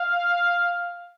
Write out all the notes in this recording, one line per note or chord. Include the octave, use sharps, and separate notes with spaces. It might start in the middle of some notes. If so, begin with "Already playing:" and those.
Already playing: F5